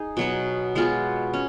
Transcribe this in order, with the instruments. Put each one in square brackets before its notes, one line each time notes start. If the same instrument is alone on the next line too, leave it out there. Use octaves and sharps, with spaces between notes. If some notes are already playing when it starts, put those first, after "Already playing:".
Already playing: [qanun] D#4 G#4
B2 F#3 B3
G#3 B3 F4 G#4
C#4